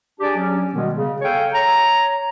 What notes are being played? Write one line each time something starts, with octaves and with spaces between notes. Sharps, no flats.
D4 G4 G#4 D5 G#5 A5
F#3 C#4
B2 D#3 G3 G#3 B3
C#3
A4 C#5 F5 G5 G#5
C#5 A#5